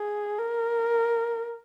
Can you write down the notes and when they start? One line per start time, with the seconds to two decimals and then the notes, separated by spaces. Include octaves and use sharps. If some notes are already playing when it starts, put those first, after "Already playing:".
Already playing: G#4
0.38 A#4